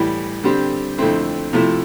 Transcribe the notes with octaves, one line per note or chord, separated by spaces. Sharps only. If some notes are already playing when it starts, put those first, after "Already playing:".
Already playing: A2 E3 G3
D3 G3 C4 G4
F2 D3 A3 C4 E4
C3 F3 A3 E4